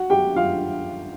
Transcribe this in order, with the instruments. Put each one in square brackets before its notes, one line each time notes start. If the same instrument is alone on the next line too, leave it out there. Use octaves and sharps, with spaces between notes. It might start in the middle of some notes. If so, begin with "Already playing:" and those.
Already playing: [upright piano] F#4 F#5
G4 G5
F4 F5